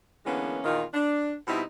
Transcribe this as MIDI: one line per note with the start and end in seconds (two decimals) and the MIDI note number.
0.25 0.60 50
0.25 0.60 52
0.25 0.60 56
0.25 0.60 58
0.25 0.60 59
0.25 0.60 61
0.65 0.83 40
0.65 0.83 46
0.65 0.83 51
0.65 0.83 58
0.65 0.83 63
0.65 0.83 65
0.94 1.33 62
1.47 1.62 47
1.47 1.62 55
1.47 1.62 60
1.47 1.62 63
1.47 1.62 64